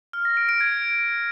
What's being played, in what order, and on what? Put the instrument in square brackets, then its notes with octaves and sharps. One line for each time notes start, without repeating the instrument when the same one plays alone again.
[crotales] F6
A#6
D7
D7
G#6